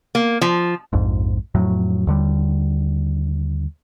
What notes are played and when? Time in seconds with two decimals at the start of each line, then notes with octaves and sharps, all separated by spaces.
0.15 A#3
0.41 F3
0.93 A#1 F2 G#2
1.54 F2 A2 F#3
2.07 D#2 D3 G3